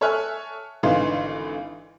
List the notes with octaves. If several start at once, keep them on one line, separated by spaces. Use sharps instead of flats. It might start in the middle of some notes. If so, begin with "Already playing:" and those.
A4 C#5 E5 G#5 F6 F#6
G#1 D3 E3 D#4 F5 C6